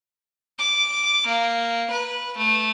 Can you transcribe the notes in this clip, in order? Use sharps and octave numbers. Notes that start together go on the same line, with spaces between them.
D6
A#3
B4
A3